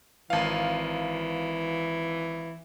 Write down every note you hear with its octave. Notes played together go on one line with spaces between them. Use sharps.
G#1 E3 F5